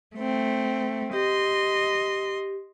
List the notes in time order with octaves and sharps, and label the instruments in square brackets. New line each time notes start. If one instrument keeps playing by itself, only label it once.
[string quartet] A3 C4
[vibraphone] G4 [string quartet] D#5 C6